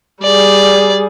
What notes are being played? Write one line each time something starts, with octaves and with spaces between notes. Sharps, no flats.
G3 G#4 D5